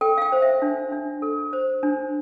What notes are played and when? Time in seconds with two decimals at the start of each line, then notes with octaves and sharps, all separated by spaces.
0.01 A4 G5
0.18 F5
0.22 G5
0.32 C5
0.42 E5
0.62 D4
0.92 D4
1.22 A4
1.53 C5
1.83 D4